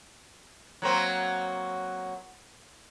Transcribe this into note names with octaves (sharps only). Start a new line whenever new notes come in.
F#3 A#3 C4